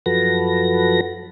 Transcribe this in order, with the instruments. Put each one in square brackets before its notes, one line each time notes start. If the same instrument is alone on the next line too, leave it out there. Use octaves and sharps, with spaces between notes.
[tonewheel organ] F#2 F3 F#4 A4 B4 A#6